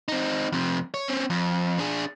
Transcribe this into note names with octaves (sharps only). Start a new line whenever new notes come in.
C4 D#4
F2 C3
C#5
C4 C#4
F2
D4 G#4